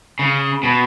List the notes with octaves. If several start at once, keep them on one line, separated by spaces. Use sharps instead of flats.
C#3
B2